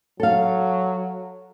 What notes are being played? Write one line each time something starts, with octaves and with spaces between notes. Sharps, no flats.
F#3 A4 F5